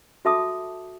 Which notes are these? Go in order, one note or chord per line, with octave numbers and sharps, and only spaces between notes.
F#4 A4 E5 A5 D6 D#6